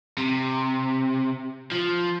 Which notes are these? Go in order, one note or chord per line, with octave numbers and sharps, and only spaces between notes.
C3
F3